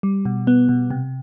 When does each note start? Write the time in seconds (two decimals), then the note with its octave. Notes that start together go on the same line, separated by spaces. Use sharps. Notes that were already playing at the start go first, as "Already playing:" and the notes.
0.03 G3
0.25 B2
0.47 B3
0.69 B2
0.90 C3